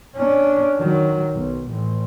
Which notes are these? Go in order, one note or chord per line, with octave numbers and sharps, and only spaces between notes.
C#4 D4
D#3 F#3
B1
A1